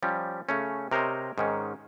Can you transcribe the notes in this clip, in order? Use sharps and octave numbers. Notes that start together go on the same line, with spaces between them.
F3 G3 C#4 G4
C#3 A3 C#4
C3 A#4 C5 C#5 D#5
G#2 D#3 C#4